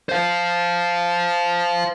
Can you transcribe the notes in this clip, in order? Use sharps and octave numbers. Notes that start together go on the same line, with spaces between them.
C5 F5